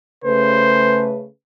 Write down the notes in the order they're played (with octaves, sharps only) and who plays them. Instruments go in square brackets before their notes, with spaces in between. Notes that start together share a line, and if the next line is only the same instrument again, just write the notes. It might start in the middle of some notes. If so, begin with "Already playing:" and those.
[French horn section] C#3 A3 B4 [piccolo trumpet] C5